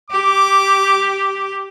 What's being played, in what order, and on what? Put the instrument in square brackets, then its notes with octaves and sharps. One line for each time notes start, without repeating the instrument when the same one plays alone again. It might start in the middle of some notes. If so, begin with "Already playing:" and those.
[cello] G4 [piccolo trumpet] D6